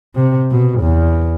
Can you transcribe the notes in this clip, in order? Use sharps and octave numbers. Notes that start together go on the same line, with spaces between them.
C3
B2
E2